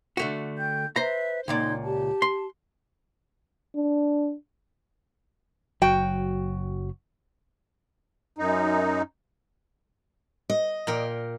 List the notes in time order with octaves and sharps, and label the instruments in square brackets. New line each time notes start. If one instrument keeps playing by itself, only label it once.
[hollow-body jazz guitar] D3 A3 F#4
[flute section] G5 G6
[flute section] B4 E5 [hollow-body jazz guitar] C5 A#5
[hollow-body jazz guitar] C#2 A#2 D5 [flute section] D#4 C6 G#6
[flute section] G4 A5
[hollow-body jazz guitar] C6
[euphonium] D4
[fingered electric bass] F#1 F#3 [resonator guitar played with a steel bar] F#4 G5
[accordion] F#2 D#4
[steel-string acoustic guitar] D#5
[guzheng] A#2 A#4 G5